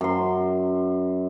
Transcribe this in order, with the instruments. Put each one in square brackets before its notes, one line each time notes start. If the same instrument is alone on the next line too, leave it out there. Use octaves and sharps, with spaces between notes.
[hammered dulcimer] F#2 C6